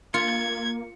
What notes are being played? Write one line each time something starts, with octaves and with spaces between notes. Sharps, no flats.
A#3 F4 G#6 C#7